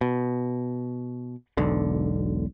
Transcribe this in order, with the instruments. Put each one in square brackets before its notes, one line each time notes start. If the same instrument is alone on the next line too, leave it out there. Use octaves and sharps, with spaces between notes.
[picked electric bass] B2
E1 B1 D3